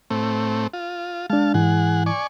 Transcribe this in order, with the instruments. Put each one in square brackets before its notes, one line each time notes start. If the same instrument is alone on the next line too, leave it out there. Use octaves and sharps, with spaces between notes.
[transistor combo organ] A2 A3 C4
F4
[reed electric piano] G#3 D4 [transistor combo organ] F5 A5
[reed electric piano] G#2 E3 E4 [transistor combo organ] G#4 F#5
[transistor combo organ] D5 G#5 C#6